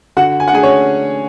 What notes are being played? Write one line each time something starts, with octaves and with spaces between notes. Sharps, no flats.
D3 F#4 F#5
G#5
F#5
A3 D4 G#4 G#5
C#4 C#5